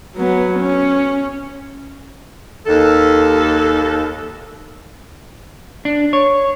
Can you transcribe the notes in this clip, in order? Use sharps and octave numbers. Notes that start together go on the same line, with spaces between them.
F#3 B3
C#4
D#2 A4
D4
C#5